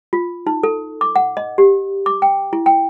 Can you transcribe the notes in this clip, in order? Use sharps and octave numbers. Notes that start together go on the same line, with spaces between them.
F4
D#4
A4
D6
F#5
D#5
G4
D6
G5
E4
G5